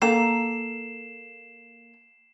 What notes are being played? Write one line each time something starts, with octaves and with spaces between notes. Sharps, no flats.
A#3 A4 A#5 C7 E7